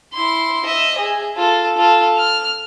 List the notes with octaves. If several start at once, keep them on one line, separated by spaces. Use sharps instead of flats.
E4 C6
D#5 E5
G#4
F4 A4
F4 A4
F6